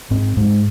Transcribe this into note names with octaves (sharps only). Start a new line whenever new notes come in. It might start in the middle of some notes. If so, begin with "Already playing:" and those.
G#2 C4
G#2 G#3